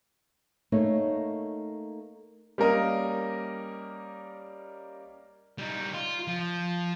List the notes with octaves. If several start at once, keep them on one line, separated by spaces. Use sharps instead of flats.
A3 A#3 D#4 C#5
G3 A#3 C#4 A#4 D#5
G3 D#4
F4
F3